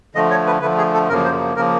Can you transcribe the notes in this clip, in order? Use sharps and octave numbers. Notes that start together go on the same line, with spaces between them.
D3 F3 A3 D#5
C#5
B4
D3 F3 A3 B4
G#4
A4
F#2 C#3 F3 A#3 A#4
C5
C#3 F3 A#3 A#4